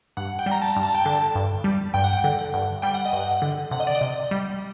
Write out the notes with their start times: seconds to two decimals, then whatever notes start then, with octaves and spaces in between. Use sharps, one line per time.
0.17 G2 F#5
0.39 G5
0.46 G3
0.51 A#5
0.62 A5
0.76 G2
0.83 A5
0.95 G5
1.05 D3 A5
1.35 G2
1.64 G3
1.94 G2 G5
2.04 F#5
2.13 G5
2.24 D3
2.39 F#5
2.54 G2
2.82 G3 G5
2.94 F#5
3.05 D#5
3.13 G2 F#5
3.42 D3
3.71 C3 F#5
3.80 D#5
3.87 D5
3.95 D#5
4.01 C3
4.31 G3